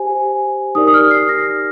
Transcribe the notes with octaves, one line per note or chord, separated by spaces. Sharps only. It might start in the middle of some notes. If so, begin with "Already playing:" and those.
Already playing: G4 C5 G#5
D#4 G4 A#4 D5 D#6
D#6
F6
C7
A#6